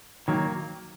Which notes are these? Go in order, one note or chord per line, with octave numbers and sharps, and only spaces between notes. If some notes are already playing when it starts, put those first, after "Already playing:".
D#3 F#3 A#3